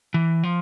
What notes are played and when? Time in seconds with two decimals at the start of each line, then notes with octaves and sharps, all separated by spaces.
0.14 E3
0.44 F3